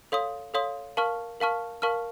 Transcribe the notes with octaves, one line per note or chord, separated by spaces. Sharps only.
A4 C#5 F5 C6 D#6
A4 C#5 F5 C6 D#6
A#4 F5 A5 C#6 F6
A#4 F5 A5 C#6 F6
A#4 F5 A5 C#6 F6